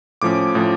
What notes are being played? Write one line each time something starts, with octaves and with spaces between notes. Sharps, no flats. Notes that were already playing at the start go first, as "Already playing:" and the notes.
A2 F3 C#4 D6
A2 F3 C#4